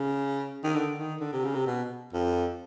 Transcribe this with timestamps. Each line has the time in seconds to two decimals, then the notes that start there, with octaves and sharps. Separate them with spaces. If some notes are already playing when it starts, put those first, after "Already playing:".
Already playing: C#3
0.64 D#3
0.75 D3
0.99 D#3
1.21 D3
1.33 C3
1.44 C#3
1.55 C3
1.67 B2
2.13 F2